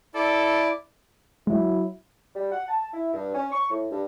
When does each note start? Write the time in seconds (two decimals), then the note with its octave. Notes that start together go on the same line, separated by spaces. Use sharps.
0.15 E4 A4 D5
1.47 F#3 G#3 E4
2.35 G3
2.52 F#5
2.68 A5
2.92 E4
3.13 G2
3.33 C#4
3.52 C#6
3.69 A2
3.90 G2